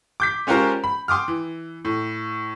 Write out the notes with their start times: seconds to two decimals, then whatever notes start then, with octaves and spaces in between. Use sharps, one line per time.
0.20 D6 G6 B6
0.47 G#3 C#4 F4 G4 A#4 C5
0.84 B5
1.08 G5 C6 D6 D#6 F6
1.28 E3
1.85 A2